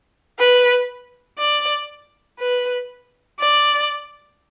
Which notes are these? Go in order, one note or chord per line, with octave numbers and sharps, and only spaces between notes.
B4
D5
B4
D5